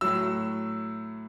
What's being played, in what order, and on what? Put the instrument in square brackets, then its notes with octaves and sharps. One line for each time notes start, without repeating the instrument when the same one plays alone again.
[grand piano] A2 F#3 E6